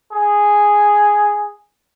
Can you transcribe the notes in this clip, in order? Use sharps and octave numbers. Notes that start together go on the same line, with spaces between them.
G#4